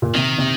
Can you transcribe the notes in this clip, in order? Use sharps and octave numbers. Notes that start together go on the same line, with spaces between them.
A#2
C3 D#3
C3